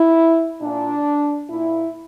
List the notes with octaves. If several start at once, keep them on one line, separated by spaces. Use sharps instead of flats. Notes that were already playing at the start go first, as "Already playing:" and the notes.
Already playing: E4
A#2 D4
A#2 E4